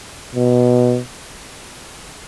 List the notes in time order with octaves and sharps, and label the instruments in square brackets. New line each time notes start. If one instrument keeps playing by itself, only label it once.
[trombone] B2